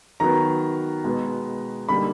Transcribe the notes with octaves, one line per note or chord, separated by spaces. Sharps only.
D#3 F#3 B3 A#5
B2 G#3 B3
D3 G3 A#3 D#4 B5